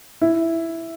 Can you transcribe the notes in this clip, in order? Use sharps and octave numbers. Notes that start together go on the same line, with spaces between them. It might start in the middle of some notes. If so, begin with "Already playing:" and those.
E4